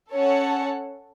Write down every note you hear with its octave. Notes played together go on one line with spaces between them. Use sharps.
C#4 A4 C#5 F#5 A5